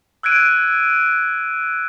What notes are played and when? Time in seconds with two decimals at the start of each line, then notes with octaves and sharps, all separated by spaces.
0.23 E6 F#6 G#6 D7 D#7